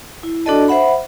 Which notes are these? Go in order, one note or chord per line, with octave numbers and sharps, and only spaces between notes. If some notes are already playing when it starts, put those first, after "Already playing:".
E4
D4 F#4 A4 D5 D#5 A5
C5 E5 F#5 B5